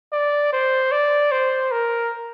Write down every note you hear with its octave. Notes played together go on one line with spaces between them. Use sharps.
D5
C5
D5
C5
A#4